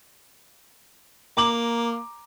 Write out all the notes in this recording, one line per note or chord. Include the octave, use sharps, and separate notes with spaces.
A#3 A#5 D6 F#7